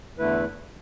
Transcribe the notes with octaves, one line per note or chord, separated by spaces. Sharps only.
E2 D3 A3 E4 B4